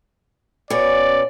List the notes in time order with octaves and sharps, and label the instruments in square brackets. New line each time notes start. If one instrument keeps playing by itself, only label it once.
[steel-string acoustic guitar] B2 C#4 [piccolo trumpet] D5